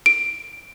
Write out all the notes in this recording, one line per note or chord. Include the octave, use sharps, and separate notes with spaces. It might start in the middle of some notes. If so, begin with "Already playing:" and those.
D7